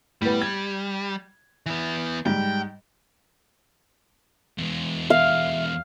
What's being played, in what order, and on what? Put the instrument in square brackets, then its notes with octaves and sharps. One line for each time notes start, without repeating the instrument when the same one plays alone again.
[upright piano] A2 B3 [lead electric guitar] G3
[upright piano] G#6
[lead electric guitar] E3 B3
[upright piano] G#2 G3 [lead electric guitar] G5
[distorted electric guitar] E2 G#3
[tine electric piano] E5 [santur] F5